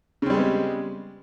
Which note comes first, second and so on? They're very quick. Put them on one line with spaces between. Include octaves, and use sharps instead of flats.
C#3 C4 G3 G#3 B3